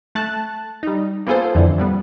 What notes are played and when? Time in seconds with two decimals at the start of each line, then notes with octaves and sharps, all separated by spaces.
0.15 A3 A5 F#6
0.83 G3 D#4
1.27 A#3 B3 F4 G#4 A4 C5
1.55 F2 D3 E3
1.78 A#2 G3 B3